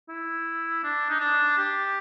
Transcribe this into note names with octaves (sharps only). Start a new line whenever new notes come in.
E4
D4
D#4
D4
G4